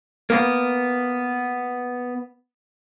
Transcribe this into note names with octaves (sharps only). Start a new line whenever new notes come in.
A#3 B3